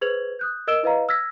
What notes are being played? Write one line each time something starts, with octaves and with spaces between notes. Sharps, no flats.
G#4 B4 C5 G#6 F7 F#7
D#6 F#6 G6
A#4 D#5 E6 D7 E7 G7
E4 B4 D#5 F5 A#5
E6 F6 G#6 A#6 B6